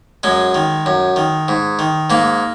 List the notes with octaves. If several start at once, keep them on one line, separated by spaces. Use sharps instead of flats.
F#2 G#3
D#3
F#2
D#3
G#2
D#3
G#2 A#3